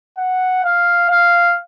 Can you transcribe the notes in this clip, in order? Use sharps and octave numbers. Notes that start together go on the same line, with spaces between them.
F#5
F5
F5